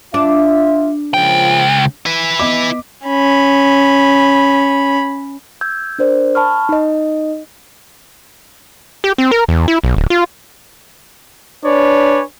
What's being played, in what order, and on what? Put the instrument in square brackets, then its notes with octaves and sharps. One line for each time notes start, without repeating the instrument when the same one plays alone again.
[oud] D4 [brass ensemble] F4 E5
[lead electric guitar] C#2 G5 [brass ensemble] A#2 C#3 F3
[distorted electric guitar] E4 B4
[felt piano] B3 D#5 D6
[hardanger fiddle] C#4 B5
[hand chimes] E6 G6 G#6
D4 A#4 C5 D5
A5 B5 C#6 F6
D#4 D#5
[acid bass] G4
C4
A#4
E2
E4
B1
D1
F4
[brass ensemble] D4 B4 C#5 D5 G#5